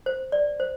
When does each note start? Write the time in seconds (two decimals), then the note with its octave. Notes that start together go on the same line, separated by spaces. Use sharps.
0.06 C5
0.32 D5
0.60 C5